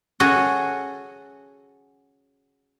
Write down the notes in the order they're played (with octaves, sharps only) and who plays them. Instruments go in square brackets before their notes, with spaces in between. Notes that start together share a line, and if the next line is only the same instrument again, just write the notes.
[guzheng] C#4 F#4 G#4 A4